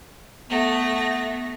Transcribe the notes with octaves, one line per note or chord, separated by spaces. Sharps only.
A3 B3 A#6